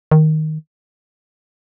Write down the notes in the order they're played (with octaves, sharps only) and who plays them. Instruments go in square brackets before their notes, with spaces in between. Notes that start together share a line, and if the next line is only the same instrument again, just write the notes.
[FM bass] D#3